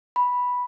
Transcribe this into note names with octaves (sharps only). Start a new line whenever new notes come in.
B5